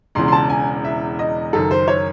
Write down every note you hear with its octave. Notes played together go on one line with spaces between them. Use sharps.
E1 E2 C#3 C6
C6
A5
G#5
E5
D#5
F#1 F#2 D#3 A4
C5
C#5